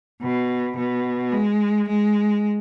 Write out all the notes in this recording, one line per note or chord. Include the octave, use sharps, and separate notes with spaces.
B2
B2
G#3
G#3